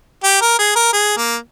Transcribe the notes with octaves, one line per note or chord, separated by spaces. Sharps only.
G4
A#4
G#4
A#4
G#4
A#3